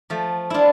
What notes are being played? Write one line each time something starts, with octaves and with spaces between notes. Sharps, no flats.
F3 A3
D4 E4 F4